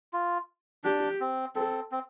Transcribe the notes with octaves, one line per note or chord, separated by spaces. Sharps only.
F4
D4 G4
C4
C4 A4
C4